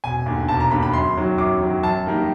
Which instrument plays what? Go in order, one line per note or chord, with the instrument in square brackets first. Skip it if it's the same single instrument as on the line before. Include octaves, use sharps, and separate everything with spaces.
[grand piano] E1 G#5
D#2 D3
E1 A5
A#5
D#2 D3 B5
B5
F#2 C6
D#3 F#3
F#2 D6
D#3 F#3
F#2 A5
D#3 G3 A#3